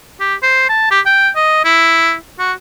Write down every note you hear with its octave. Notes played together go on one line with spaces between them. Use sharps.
G4
C5
A5
G4
G5
D#5
E4
F#4